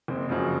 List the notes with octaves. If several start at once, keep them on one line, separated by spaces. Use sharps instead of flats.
F#1 C4
F#2 C#3 F3